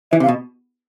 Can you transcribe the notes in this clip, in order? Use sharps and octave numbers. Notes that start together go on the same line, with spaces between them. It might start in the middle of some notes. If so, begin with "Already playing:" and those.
E3 E5
C3
F5
B2